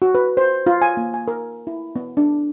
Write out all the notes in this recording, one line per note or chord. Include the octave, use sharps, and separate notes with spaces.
F#4
B4
C5
F4
G#5
A#3
G#5
A#4
E4
B3
D4